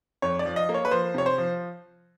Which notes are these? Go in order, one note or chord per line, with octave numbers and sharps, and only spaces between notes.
F2 C#5
D5
F3
D#5
A#3
C#5
B4
F3 C5
C3 C#5
C5
F3